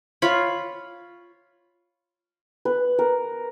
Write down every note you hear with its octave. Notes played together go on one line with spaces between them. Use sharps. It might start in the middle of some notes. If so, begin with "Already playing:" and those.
F4 C#5 B5
B4
A#4